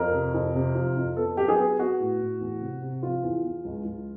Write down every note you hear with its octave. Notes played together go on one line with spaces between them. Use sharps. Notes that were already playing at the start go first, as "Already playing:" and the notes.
Already playing: F2 A#4
C3
F2
C3
F3
F2
B3 A4
F#3 G4
G#4
B3
B3 F#4
A2
A2
E2
C3
C3
F3 F4
E2
E2
C#2
C#2